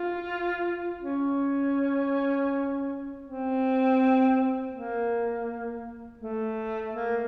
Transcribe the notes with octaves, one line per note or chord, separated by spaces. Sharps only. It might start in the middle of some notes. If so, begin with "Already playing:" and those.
Already playing: F4
C#4
C4
A#3
A3
A#3